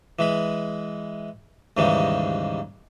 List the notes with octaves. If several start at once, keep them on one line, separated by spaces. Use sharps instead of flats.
E3 G#3 B5
D#2 G#2 C#3 E3 G3 G#3